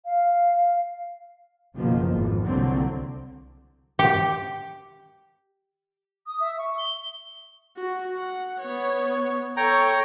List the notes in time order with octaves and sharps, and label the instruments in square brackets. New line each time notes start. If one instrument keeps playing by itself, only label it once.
[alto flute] F5
[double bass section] F#1 B1 D#3 F3 A#3
G#1 F2
C2 D3 F#3 A#3 C4
[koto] G4
[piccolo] D#6
E5
C#6
G7
[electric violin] F#4
F#5
B3 C#5
[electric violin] A4 C#6 [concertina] C#5 G5 A#5